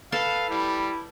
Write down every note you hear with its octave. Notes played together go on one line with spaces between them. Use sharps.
A4 B4 F5 A5
G3 E4